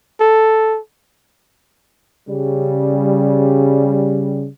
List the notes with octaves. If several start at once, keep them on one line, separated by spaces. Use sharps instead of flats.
A4
C#3 G3